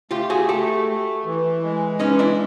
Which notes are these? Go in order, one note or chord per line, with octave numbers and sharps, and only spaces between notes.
A3 F4 G4
F#4 G#4
A3 G4 A4
A3
E3
G#3
E3 C#4 D#4
D4 E4